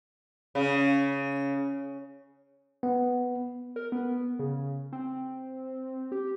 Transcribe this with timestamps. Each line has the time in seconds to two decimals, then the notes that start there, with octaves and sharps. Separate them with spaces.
0.55 C#3
2.83 B3
3.76 A#4
3.92 B3
4.39 C#3
4.93 C4
6.12 G4